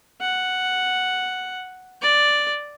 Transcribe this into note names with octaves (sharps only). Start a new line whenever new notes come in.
F#5
D5